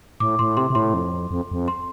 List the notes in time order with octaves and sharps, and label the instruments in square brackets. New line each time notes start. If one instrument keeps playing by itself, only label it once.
[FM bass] A2 [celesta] D6
[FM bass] A2 [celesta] C6
[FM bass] C3 [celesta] C6
[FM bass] C3
[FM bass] A2 [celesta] C6
[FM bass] F2
F2
F2
[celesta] C6